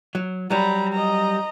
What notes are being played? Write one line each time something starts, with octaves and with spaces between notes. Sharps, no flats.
F#3
F#3 G3 A#5 B5
D#5 A#5